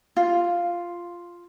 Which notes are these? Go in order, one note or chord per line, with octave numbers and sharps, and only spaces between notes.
F4